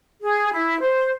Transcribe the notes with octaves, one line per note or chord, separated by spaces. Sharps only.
G#4
E4
C5